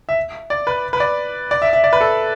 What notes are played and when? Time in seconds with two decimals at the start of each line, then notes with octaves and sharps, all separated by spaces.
0.09 E5
0.50 D5
0.67 B4
0.93 B4
1.00 D5
1.51 D5
1.62 E5
1.73 E5
1.84 D5
1.93 B4
2.01 A4